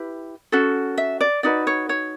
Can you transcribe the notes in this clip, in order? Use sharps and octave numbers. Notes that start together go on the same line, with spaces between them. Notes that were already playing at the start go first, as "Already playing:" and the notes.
Already playing: E4 G4 B4
C#4 F#4 A4
E5
D5
D#4 F#4 B4 D5
C#5
C#5